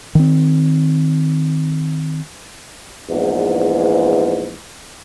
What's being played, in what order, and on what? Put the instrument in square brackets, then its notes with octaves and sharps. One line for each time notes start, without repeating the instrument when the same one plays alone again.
[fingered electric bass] D#3 C4
[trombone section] A#1 E2 G#2 E3